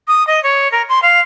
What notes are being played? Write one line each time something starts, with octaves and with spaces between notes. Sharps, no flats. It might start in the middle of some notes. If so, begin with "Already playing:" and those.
D#6
D#5
C#5
A#4
C6
F5